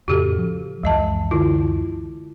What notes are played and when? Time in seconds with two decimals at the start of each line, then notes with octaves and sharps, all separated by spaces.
0.08 F2 A2 C#3 F#4 G4 A4
0.38 F3
0.83 C#2 F#2 E3 G#3 D#5 A5
1.31 D3 E4 F4